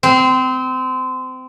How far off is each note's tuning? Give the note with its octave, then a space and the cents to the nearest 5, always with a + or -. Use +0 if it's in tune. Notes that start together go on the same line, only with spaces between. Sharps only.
C4 -25